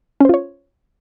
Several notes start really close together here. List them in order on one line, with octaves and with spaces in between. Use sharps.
C#4 C5 F4 C#5